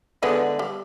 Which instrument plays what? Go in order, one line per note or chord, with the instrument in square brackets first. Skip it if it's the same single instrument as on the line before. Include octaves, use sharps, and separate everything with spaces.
[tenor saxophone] D3 [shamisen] G#3 B3 E4
[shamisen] G3